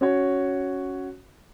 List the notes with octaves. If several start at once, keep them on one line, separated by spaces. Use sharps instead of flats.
C#4 F#4 C#5